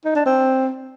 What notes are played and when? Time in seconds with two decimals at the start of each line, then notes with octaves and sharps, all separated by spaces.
0.05 D#4
0.16 D4
0.26 C4